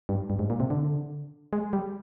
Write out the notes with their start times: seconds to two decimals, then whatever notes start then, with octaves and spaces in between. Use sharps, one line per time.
0.09 G2
0.30 G2
0.39 G#2
0.50 A#2
0.60 C3
0.70 D3
1.53 G#3
1.73 G3